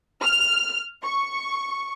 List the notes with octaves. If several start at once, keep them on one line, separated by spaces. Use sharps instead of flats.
F6
C#6